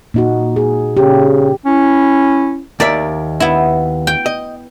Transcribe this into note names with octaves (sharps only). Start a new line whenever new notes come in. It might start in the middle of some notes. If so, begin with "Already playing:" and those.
A#2 D#4 F#4
G#4
C#3 G4
C#4 E4
D#2 A#4 D5 E5
B3 E4
G5
D#5